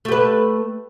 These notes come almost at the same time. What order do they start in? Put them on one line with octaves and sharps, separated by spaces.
A3 G4 B4